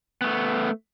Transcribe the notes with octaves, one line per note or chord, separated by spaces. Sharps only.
A3 B3